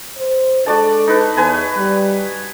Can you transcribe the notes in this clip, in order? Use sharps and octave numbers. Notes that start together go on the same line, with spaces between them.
C5
G#3 D4 F#4 A4 D5 A5
D#4 B4
E2 B4 G#5 A#5
G3